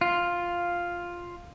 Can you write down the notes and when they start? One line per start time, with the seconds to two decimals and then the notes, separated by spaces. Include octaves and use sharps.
0.01 F4